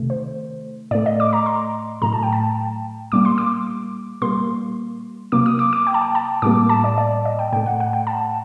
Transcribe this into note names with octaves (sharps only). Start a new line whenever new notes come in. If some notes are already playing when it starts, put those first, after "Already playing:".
Already playing: C3 D#3 A3
C5
A2 A3 D5
D#5
D6
A#5
C6
A2 F#3 A3 A#5
A5
G5
A5
A#2 G3 A#3 D6
C6
D6
A#2 G3 A#3 C6
C3 F#3 A#3 D6
D#6
D6
D6
G5
A5
G5
A5
A2 G3 A#3 D6
A5
D5
D5
D#5
G5
A2 A3 G5
F#5
F#5
G5
A5